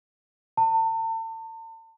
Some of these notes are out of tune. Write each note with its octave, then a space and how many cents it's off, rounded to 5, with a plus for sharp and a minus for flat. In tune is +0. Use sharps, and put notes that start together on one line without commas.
A5 +40